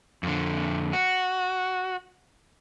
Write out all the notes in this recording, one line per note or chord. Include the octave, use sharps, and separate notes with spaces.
F2 D3
F#4